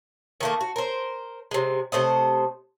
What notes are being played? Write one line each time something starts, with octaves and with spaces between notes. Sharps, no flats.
D#3 A3 A#3
F#4
A#4 C5
C3 G#3
C3 A3 C5 D#5